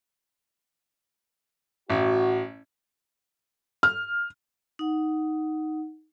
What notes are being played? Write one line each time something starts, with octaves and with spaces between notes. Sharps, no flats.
A1 F#4
F6
D#4 F#5